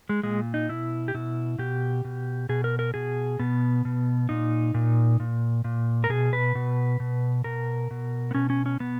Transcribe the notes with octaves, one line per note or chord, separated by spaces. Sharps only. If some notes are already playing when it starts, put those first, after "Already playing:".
G#3
A#2 G#3
D#4
B2 E4
G4
B2 E4
B2 G4
B2
B2 G#4
A#4
A#4
B2 G#4
B2 B3
B2
A#2 D#4
A#2
A#2
A#2
A#4
B2 G#4
B4
B2
B2
B2 A#4
B2
B3
B2 C#4
C#4
C#4
B2 B3